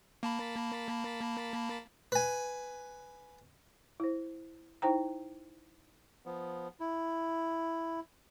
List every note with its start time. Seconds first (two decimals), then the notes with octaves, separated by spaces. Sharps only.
0.23 A#3 A5 B5
2.12 B4 G#5
4.00 E4 C5
4.82 D#4 E4 C5 G5 A#5
6.26 F3 B3
6.80 E4